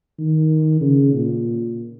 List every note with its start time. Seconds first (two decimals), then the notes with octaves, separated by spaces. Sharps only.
0.19 D#3
0.81 C#3
1.13 A#2